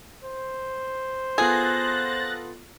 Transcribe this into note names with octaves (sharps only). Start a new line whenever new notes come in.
C5
B3 F4 G#4 A4 F#6 A6 A#6